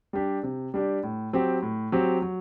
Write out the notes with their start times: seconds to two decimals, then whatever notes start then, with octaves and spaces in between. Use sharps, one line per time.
0.13 G3 D4 G4
0.43 C3
0.74 G3 D4 G4
1.03 A2
1.33 F#3 C4 G4
1.62 A2
1.92 F#3 C4 G4
2.22 F#3